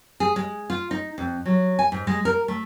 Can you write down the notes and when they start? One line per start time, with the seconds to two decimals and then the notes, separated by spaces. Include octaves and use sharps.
0.20 G#4
0.36 G#3
0.70 F4
0.91 D#4
1.18 F2
1.46 F#3
1.79 G#5
1.92 G#2
2.07 G#3
2.25 A#4
2.48 A3